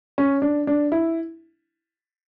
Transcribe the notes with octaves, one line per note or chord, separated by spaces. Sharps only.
C#4
D4
D4
E4